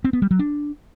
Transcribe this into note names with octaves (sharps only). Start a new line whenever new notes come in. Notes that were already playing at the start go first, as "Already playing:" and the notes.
C4
B3
G3
F#3
D4